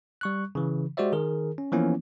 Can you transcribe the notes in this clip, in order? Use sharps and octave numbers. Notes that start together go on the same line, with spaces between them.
G3 C#6 F#6
C#3 E3
G#3 F#4 G4 C5 D5 E5
D#3 G#4 A#4
C#4
E3 F3 A#3 B3 C#4 E4